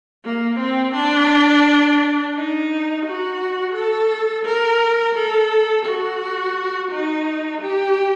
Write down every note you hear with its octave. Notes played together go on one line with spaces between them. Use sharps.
A#3
C4
D4
D#4
F#4
A4
A#4
A4
F#4
D#4
G4